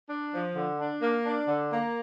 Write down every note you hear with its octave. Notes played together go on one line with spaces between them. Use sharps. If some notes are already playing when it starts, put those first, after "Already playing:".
D4
F3
D3
D4
A#3
D4
D3
A#3